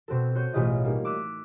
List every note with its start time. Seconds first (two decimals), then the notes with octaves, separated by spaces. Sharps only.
0.08 B2 C4 F#4 A4
0.35 F#4 C5 C#5 G6 D#7
0.53 A1 B2 G#3 F4 G#4 D#5
0.84 G3 A#3 D#4
1.05 D6 E6 F#6 B6 D#7